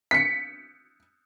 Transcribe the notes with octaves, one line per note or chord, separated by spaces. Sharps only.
B6 C#7